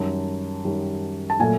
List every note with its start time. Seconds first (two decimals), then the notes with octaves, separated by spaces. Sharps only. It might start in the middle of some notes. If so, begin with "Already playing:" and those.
Already playing: F#2 D#3 G3 A5
0.65 F#2 D#3 G3
1.30 A5
1.40 A#2 F#3 A3 G#5